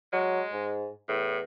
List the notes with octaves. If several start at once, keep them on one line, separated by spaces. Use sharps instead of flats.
F#3 G#3
G#2
E2 A2